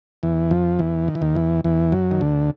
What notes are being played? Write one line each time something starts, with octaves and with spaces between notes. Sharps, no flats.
E2 E3
F2 F3
E2 E3
D#3
E3
D#2 D#3
E2 E3
E2 E3
F#2 F#3
D#3
D2 D3